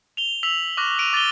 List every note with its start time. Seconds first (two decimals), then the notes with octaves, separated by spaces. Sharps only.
0.17 F7 G7
0.43 E6 B6 F7 F#7
0.77 C#6 D6 F6 F#6 A#6
0.99 D7 D#7 F7
1.13 D6 A6 D#7 F7 G7